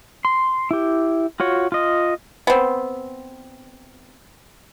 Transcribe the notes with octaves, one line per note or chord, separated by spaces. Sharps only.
C6
E4 G4
F4 F#4 C#5
F4 D#5
B3 C4